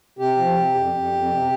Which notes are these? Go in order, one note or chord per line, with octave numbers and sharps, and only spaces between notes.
C3 G4
F3
C3
F2
F2
F2
C3